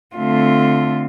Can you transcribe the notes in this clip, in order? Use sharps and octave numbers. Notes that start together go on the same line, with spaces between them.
D3 A3 C4 F4